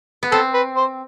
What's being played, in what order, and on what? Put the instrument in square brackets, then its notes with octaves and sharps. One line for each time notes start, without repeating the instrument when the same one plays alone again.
[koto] B3
[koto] C4 [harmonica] A4
[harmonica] B4
C5